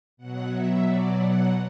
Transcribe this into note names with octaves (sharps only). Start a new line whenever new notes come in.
B2 F#3 F#5
E5
D5
F#5